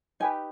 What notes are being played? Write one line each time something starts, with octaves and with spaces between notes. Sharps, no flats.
D#4 G4 B4 G#5